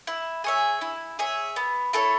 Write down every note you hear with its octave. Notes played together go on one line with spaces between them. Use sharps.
E4
G#4 C#5 E5
E4
G#4 C#5 E5
B3
E4 A4 C#5